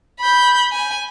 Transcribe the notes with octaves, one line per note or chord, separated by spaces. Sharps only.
B5 G6
G#5